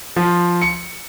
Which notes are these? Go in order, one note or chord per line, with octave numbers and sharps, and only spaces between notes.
F3
C#7